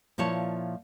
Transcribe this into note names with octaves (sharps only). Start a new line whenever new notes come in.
A#2 F3 E4 C#5 A5